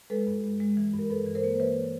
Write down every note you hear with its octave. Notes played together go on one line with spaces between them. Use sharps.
G#3 A4 B4
G2
G#3
G#3
E3
G2
A#4
G2 A4 B4
E3
A#4 C5
A#3
C5
E3 B4 C#5